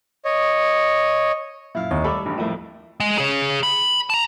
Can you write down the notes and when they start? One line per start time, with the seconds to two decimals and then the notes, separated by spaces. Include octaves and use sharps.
0.25 C#5 D#5
1.75 F#2 A#2 E4 F5
1.91 D#2 D#5
2.04 G3 A3 A4 D5 B5 D6
2.25 G#1 E2 G2
2.38 F2 A2 F3 G3 A#3 E4
3.00 G#3
3.18 G#4 C#5
3.63 B5
4.10 A5 A#5